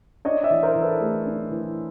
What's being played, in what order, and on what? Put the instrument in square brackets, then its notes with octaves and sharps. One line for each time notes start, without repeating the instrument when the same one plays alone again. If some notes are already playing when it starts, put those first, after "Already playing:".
[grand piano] D4 C#5 D#5
D5 E5
E3
A#4 C5
E3
A4 B4
A3 G#4
D4
E3